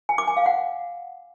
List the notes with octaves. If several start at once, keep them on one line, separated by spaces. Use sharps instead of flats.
G#5
D6
G#5
F5
F#5